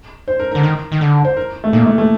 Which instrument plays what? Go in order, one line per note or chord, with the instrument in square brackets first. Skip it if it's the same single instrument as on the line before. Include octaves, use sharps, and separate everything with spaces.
[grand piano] C5
A#4
[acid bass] D3 [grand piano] A#4
[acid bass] D#3
D#3
D3
[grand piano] C5
A#4
A3
[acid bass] A#2 [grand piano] A#3
[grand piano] A3
A3